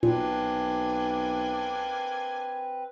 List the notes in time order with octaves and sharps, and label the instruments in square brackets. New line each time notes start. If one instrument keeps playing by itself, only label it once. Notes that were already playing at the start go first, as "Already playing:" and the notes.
[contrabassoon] B1 [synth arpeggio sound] A#2 [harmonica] A#3 D4 G#5 [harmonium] C4 B4